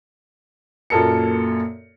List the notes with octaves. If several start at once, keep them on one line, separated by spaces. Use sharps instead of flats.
F#2 A#2 A#3 A4 A#4 C#7